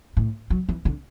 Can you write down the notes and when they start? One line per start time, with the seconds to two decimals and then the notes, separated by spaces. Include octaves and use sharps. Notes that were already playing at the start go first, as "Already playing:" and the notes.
0.17 A2
0.50 F#3
0.69 E3
0.85 D3